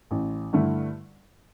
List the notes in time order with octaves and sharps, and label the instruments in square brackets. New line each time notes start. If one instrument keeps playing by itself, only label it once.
[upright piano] A1
G2 D3 A3 E4